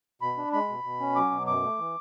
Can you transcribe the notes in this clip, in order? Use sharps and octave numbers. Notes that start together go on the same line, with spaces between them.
B2 B5
D4
G#3 B5
B2
B2
C#4
F#3 D6
B2
F#2 D6
A3
E3